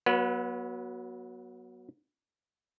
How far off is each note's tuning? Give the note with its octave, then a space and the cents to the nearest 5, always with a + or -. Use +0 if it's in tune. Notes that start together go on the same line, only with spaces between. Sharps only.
F#3 +0 B3 -35 B4 +5